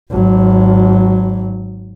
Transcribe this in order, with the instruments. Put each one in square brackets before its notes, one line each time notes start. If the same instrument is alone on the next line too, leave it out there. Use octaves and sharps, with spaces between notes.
[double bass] G#1 F#3